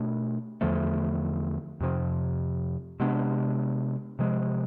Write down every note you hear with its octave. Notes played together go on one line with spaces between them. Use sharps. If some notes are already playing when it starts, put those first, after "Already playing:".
Already playing: B2 A3 D4
E2 D3 F3 A3
F2 C3 F3
C3 G#3 B3 D4
C3 F3 G#3